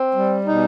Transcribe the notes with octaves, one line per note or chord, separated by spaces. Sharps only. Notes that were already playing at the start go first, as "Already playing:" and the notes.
Already playing: C4
G3
B2 D#4